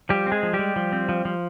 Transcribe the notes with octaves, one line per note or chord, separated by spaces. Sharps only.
F3 G3 G4
C4
G#3 G#4
F3
G3 G4
G#3
F3
C4
F3
F3